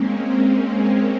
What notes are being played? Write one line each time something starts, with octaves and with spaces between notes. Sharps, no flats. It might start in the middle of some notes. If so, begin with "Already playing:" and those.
Already playing: G#3 A#3 C4 C#4